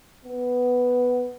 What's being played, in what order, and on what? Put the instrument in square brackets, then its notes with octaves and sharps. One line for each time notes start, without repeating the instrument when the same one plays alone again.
[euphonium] B3